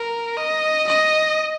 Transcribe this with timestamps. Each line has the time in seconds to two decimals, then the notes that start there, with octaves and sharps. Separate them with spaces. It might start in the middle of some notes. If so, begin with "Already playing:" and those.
Already playing: A#4
0.38 D#5
0.88 D#5